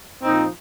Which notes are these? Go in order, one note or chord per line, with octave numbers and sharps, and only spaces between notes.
A#2 F3 C4 D#4